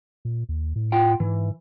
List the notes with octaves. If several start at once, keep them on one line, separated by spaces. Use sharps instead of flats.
A#2
D#2
A2
F4 F#5 G5
G#2 E3